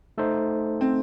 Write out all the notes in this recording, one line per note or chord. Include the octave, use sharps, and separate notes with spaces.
A3 D#4 A4 C5
C4